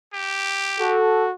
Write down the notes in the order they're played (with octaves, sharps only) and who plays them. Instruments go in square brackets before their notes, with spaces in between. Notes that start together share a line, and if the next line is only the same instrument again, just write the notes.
[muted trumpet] G4
[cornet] F#4 [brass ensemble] A4